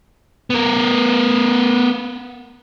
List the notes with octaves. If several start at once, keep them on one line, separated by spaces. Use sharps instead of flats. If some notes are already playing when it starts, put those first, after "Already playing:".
B3 A#4